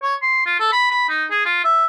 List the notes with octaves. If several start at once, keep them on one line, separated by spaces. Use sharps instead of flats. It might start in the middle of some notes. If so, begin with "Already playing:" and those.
C#5
C6
F4
A4
B5
B5
D#4
G#4
F4
E5